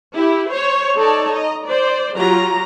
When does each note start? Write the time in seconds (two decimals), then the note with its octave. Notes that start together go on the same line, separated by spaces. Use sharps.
0.14 E4 G4
0.50 C5 C#5
0.95 D#4 A4 C#5 D5 A5
1.34 D#5 A#5
1.66 C5 D5
2.16 F#3 F4 G4 A#5